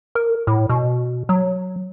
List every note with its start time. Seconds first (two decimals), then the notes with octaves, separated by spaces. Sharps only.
0.15 A#4
0.47 A2
0.69 B2
1.29 F#3